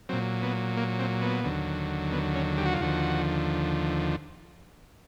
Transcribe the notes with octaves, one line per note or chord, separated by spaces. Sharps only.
A#2 F#3 C4
B3
A#3
C4
B3
D#2 D3 F#3
B3
C#4
G4
F#4
F4
D#2 D3 F3 F#4